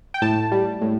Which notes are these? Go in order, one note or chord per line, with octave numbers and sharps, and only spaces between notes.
G5
A2 A5
G3
A2